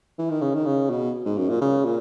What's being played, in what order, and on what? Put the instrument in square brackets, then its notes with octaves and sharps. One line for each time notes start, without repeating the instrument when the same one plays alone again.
[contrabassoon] E3
D#3
C#3
D#3
C#3
B2
G#2
F#2
A#2
C#3
A#2